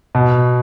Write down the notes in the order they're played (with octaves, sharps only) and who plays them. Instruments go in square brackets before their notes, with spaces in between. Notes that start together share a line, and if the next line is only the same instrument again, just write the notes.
[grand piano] B2